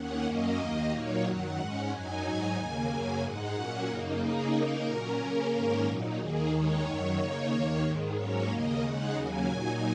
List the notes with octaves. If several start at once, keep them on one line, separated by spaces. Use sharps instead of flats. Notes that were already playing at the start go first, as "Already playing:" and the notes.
Already playing: D#2 D#3 A#3 C#4 F#5
F#2 F#3 A#3 C#4 D#5
D#2 D#3 A#3
A#2 F#3 A#3 D#4 C#5
F#2 D#3 F#3 F#5
G#2 G#3 C#4
F#2 F#3 D#4 G#5
G#2 F#3 D#4
D#2 C#3 A#3 G#5
F#2 C#3 F#3 A#3
G#2 G#3 D#4 F#5
A#2 F#3 A#3 C#4
F#2 C#3 A#3 D#4
C#3 A#3 D#4 G#4
C#3 A#3 D#4 A#4
A#2 F#3 C#4
C#3 A#3 C#4 A#4
G#2 D#3 A#3 C#4
A#2 F#3 D#4
D#2 D#3 A#3 G#4
D#2 D#3 G#3 D#4 C#5
F#2 D#3 F#3 C#5
C#3 A#3 D#4
D#2 D#3 A#3
G#2 D#3 G#3
G#2 F#3 A#3 C#4 C#5
D#2 C#3 A#3 D#5
C#3 G#3 D#4 F#5
D#2 C#3 F#3 A#3 G#5
A#2 F#3 D#4